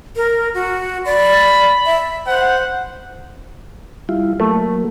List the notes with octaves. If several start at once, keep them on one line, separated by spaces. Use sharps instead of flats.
A#4
F#4
D5 B5
E5
C5 F#5
G3 E4 F4
F#3 A3 A#3